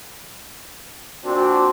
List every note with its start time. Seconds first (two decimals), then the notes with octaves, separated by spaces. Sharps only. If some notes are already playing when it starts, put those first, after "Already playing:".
1.24 A#2 C4 D4 F#4